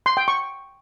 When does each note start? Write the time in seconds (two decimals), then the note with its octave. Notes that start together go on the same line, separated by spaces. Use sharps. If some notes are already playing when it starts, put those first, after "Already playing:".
0.06 C6
0.17 G5
0.28 C#6